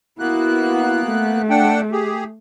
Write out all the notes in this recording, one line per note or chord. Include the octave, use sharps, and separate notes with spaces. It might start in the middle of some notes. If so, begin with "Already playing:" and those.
A#3 B3 E4 F#4 F#6
A3
D4 F#5 G5
G4 G#4